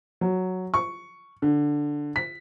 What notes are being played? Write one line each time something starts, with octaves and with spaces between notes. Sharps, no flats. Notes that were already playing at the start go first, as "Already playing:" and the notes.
F#3
C#6
D3
B6